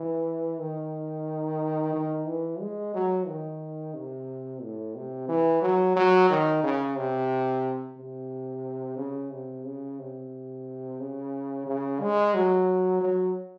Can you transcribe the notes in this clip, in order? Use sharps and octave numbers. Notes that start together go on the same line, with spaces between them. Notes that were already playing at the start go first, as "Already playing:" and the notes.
Already playing: E3
D#3
D#3
E3
G#3
F#3
D#3
C3
A2
C3
E3
F#3
F#3
D#3
C#3
C3
C3
C#3
C3
C#3
C3
C#3
C#3
G#3
F#3
F#3